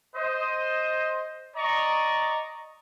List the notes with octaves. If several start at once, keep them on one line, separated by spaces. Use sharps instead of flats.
C5 D#5
D5 D#5 A#5 C#6